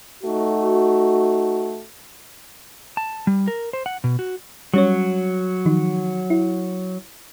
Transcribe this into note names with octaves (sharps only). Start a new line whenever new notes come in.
A3 D#4 F#4
A5
G3
A#4
C5
F#5
B2
F#4
F#3 G3 C#4 C#5
D#3 F3 D#4
E4